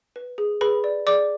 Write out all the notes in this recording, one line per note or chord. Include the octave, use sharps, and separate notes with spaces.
B4
G#4
G#4 B4 B5
D5
G#4 D5 D6